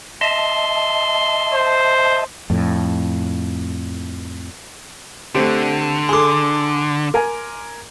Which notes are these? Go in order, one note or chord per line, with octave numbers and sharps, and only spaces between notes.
D#5 E5 A5 C6
C5
F2 A2
D3 A3 C4 G4
G#4 A4 C6 D6
A#4 G#5